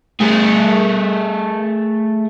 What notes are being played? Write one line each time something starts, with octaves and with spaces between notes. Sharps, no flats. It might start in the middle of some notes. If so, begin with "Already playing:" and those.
A3 G#4